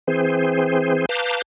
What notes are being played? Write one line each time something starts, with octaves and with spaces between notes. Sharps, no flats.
E3 C4 G#4 C5
B4 F5 A5 A#5 D6 G6